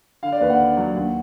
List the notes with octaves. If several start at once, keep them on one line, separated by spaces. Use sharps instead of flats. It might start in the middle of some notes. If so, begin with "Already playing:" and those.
D3 F5
D5
D#2 B4
F#5
D3
F#3
D#2